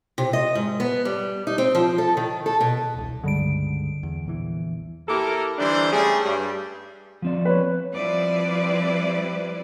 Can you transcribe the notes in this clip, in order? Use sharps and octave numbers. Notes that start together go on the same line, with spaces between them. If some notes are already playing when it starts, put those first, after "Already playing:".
C3
D#5
G#2
B3
G3
D#4
C4
F3
A4
D#3
A4
B2
E1 C2
C#2 G2 D3 G3 G#3 D7
E2
A#1 E2 E3
A#3 E4 G4 A4 A#4
D3 E3 G3 D4 D#4 C5
G3 A3 C#4 G#4
G2 G3
F3 C4 D5
B4 C#5
F3 G3 C4 E4 B4 D5